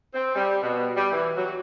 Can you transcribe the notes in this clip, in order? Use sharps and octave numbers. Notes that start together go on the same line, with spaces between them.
C4
G3
B2
G3
E3
F#3